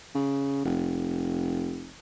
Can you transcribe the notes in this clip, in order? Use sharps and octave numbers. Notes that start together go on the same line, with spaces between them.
C#3
F1